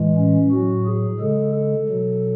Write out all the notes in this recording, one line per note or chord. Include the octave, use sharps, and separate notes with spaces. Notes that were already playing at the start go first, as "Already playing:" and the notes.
Already playing: A2 E3 G#3
C#4
A2 F#3 F#4
G#4
C#3 G#3 A4
A4
B2 F#3